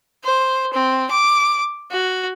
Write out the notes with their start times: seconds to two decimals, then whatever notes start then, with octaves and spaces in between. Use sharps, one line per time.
0.25 C5
0.73 C4
1.11 D6
1.91 F#4